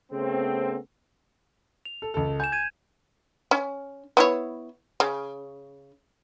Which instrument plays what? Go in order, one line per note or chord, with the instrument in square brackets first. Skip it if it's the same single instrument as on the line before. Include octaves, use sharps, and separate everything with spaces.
[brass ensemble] C#3 A3 B3 C4
[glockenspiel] F7
[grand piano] A4
C#2 A4
[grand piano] G#5 [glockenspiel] G6 E7
[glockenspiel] G#6 D#7
[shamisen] C#4
B3 E4 C#5
C#3